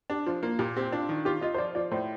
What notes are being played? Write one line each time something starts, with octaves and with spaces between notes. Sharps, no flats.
D4 G4
F3 F4
A#3 F4
A#2 G4
C4 G4
D4 F4
D#3
F4 G4
F4 D#5
C5
F3 D5
F3 D5
A2 C5